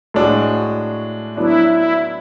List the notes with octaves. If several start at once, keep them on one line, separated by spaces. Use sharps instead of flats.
A2 G#3 D4 F#4
F#3 B3 D4 E4
E4